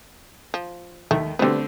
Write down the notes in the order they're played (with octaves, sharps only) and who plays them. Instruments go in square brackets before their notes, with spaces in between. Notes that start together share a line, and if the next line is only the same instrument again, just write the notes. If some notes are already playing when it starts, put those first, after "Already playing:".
[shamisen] F3
[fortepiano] D#2 D#3 [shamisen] A3
[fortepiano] D3 A3 C4 [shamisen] G3 B3